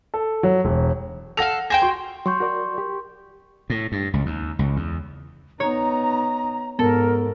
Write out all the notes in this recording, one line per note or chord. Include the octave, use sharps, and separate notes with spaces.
A4
F#3
E1
A4 F5 F#5 A#6 F7
G#4 C5 G5 A#6
F#4 C6
F#3 C6 C#6 G6
F#4 A#4 D5
G4
A2
G2
C#2
D#2
C#2
E2
B3 D#4 C#5 A#5
G#2 B3 A4 A#4